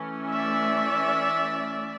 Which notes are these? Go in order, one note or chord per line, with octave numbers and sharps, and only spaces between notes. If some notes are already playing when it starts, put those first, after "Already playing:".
Already playing: E3 A3 C#4
D5 E5